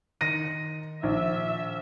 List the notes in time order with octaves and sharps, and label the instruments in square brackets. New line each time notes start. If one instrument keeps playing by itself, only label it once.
[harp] D#3 C6 C#7 [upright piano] A#6 D#7
[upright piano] A#1 [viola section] E5